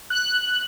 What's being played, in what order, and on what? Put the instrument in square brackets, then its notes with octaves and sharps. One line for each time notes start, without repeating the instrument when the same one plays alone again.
[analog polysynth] F#6